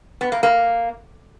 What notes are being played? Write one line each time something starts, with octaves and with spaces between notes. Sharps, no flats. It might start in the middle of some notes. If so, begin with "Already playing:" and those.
B3
A#3
A#3